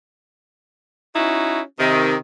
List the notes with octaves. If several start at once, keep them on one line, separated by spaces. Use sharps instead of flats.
C#4 D#4 E4 F#4
C3 D#3